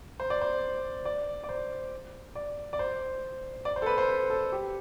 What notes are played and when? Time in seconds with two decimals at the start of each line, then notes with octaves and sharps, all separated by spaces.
0.20 C5
0.30 D5
0.41 C5
1.05 D5
1.44 D5
1.49 C5
2.35 D5
2.73 D5
2.79 C5
3.65 D5
3.76 C5
3.82 A4
3.86 B4
3.98 C5
4.09 B4
4.30 A4
4.52 G4